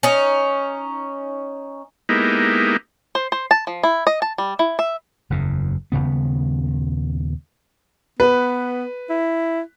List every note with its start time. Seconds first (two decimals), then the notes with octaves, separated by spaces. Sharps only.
0.03 C#4 D#4
2.09 G#3 A#3 B3 D#4 E4 G4
3.15 C5
3.32 C5
3.51 A5
3.67 F3
3.83 E4
4.07 D#5
4.22 A5
4.38 G3
4.59 E4
4.79 E5
5.30 F#1 E2 C#3
5.92 D#1 G#1 C#3 B3
8.20 B3 B4
9.10 E4